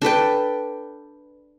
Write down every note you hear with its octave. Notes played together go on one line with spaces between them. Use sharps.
D4 A4 B4 G5